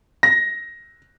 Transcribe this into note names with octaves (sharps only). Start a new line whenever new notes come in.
A#6